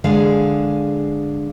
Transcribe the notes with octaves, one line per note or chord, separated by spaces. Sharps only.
D3 G#3 G#4 F5